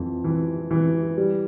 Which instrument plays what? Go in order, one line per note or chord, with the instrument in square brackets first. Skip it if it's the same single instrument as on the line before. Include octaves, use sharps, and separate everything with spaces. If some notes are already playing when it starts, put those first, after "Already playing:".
Already playing: [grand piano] F2 E3
E3
E3
G3